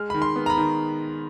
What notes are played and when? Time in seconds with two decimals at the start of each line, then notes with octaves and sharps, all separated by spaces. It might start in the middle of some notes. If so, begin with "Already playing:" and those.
Already playing: G#3 F6
0.10 D#3 B5
0.22 C6
0.36 B3
0.46 A#5
0.50 B5
0.57 D#3